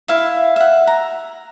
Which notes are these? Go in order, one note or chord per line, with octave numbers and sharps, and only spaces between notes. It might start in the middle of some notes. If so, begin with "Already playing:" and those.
E4 E5 F5
E5 F#5
A#5